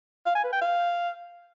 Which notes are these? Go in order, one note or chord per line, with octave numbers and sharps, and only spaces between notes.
F5
G#5
B4
G5
F5